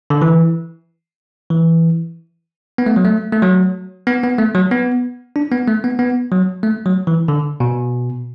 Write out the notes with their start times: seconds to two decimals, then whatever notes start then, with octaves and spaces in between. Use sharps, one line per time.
0.10 D3
0.22 E3
1.50 E3
2.78 B3
2.86 A3
2.96 F#3
3.05 A3
3.33 A3
3.42 F#3
4.07 B3
4.23 B3
4.39 A3
4.55 F#3
4.71 B3
5.36 D4
5.52 B3
5.68 A3
5.84 B3
5.99 B3
6.31 F#3
6.63 A3
6.86 F#3
7.07 E3
7.28 D3
7.60 B2